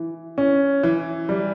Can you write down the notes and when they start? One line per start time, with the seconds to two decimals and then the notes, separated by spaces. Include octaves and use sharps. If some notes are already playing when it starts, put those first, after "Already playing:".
Already playing: E3
0.38 C#4
0.83 E3
1.29 G3